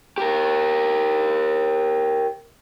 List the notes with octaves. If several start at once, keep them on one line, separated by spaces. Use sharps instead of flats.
G4 A#4